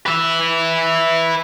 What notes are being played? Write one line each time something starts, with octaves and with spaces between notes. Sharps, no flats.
B4 E5